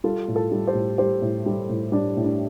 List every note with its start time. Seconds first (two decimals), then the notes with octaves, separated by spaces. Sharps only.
0.04 G3 F4 A4
0.28 A2
0.36 F4 A4
0.52 G3
0.67 G4 C5
0.74 A2
0.98 G3 G4 C5
1.22 A2
1.46 G3
1.70 A2
1.92 G3 D4 G4
2.17 A2
2.24 D4